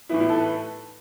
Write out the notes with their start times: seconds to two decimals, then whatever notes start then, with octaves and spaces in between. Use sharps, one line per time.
0.09 A2 E3 B3 E4
0.20 E4
0.29 A4
0.39 B4